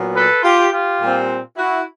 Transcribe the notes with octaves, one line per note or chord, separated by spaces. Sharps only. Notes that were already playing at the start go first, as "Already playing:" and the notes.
Already playing: A#2 F#3 B3
A4 B4
F4 G4
F4 G4
A#2 G3 C4
E4 F#4